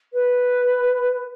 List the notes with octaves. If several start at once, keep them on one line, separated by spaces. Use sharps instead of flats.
B4